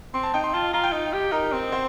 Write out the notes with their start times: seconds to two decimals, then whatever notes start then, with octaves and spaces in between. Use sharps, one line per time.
0.14 C4 C6
0.23 A5
0.34 D#4 G5
0.44 C6
0.54 F4 A5
0.73 F4 A#5
0.84 G5
0.92 D#4
1.13 G4
1.32 D#4 A#4
1.53 C4
1.72 C5